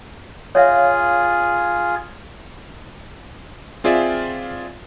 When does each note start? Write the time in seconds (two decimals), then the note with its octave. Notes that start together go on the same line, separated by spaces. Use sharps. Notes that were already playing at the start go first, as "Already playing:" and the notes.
0.55 F4 G#4 C#5 E5 F5
3.84 C4 F4 G#4 D5 E5